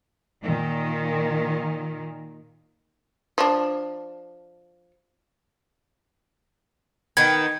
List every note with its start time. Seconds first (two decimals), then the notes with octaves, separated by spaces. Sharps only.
0.42 A#2 D#3
3.38 F3 D4
7.17 D#3 B3 G#6